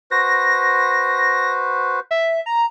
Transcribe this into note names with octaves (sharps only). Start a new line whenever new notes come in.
F#4 B4 C5 A#6
E5
A#5